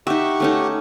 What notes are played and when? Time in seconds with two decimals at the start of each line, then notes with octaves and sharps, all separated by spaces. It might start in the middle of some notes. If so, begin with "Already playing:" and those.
0.07 D#4 G4 E5 F#5 C#6
0.40 A3 C#4 D#4